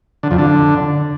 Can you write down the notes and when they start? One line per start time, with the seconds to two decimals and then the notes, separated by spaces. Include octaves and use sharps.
0.23 D3
0.31 F2
0.38 D3